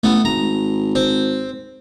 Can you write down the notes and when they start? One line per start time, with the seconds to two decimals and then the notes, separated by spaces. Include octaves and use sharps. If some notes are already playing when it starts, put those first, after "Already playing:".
0.04 A1 A3 B3
0.25 G#1 A#5
0.95 C4